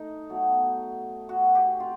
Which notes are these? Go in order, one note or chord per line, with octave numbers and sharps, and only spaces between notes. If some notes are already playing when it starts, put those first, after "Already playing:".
Already playing: A3 D#4
B2 F#3 A3
F#4
G4
C3 F4